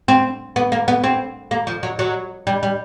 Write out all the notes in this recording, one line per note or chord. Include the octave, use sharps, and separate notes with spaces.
C4
B3
A#3
B3
C4
A#3
F3
F#3
F#3
G3
G3